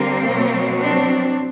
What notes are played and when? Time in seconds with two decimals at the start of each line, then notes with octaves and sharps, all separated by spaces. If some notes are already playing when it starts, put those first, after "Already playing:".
Already playing: D3 G3 A#3 C4
0.28 B2 F#3
0.78 C4 D4